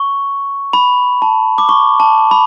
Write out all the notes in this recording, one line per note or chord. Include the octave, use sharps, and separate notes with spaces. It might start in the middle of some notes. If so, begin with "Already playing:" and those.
Already playing: C#6
B5
A5
D6
C#6
A5
B5